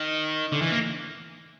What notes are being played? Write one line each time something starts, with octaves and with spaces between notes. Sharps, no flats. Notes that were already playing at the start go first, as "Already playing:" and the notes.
Already playing: D#3
D3
E3
A#3